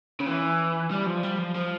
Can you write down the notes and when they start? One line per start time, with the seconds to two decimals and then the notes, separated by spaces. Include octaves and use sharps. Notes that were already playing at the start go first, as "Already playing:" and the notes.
0.20 C#3
0.27 E3
0.91 G3
1.06 F3
1.23 G3
1.38 F3
1.55 F3